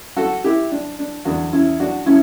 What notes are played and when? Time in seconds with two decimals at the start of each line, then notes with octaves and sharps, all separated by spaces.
0.17 F#4 A4
0.44 E4 G4
0.72 D4
0.99 D4
1.25 E2 D3 D4 F#4
1.53 C#4 E4
1.80 D4 F#4
2.06 C#4 E4